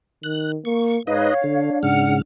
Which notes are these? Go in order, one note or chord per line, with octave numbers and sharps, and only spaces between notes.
D#3 F#6
A#3 C#6
G#2 D#4 B4 C#5 D#5 F5
D3 D4
G#2 C#3 F#5 F6